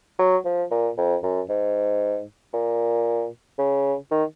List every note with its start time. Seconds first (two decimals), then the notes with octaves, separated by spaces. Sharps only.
0.19 F#3
0.45 F3
0.71 A#2
0.98 F2
1.23 F#2
1.49 G#2
2.54 A#2
3.59 C#3
4.11 D#3